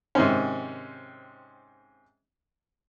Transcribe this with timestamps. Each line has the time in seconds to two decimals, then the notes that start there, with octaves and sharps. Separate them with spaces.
0.15 G#2 C3 D#3 C4 C#4